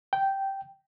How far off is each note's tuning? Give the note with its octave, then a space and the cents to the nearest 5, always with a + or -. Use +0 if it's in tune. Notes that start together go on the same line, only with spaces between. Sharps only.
G5 -10